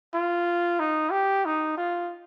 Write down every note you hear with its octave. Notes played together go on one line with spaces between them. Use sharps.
F4
D#4
G4
D#4
F4